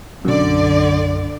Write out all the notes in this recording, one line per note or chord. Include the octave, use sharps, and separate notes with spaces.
B1 F#2 D3 D5